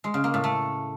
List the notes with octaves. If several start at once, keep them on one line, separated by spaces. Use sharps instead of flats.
G#3
C#3
A#3
A2
A3